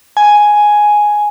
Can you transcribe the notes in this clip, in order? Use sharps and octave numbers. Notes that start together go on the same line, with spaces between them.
G#5